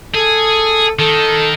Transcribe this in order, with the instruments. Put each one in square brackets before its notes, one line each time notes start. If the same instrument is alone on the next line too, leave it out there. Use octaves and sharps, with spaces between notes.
[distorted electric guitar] G#4 [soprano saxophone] A4
[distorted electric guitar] D#3 [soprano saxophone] A4